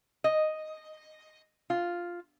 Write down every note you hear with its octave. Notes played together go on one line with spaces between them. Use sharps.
D#5
F4